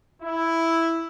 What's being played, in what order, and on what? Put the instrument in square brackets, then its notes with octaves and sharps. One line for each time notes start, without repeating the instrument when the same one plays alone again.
[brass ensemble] E4